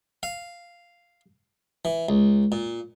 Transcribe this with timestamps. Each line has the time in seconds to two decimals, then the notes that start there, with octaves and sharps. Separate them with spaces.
0.23 F5
1.85 E3
2.09 C#2
2.52 A#2